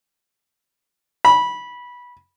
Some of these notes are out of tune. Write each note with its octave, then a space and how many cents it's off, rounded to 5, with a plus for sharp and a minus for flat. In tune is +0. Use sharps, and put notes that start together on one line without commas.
B5 -15